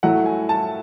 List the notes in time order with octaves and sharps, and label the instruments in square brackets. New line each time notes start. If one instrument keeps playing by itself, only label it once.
[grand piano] A2 F#3 A3 E4 F#5
G#5
A5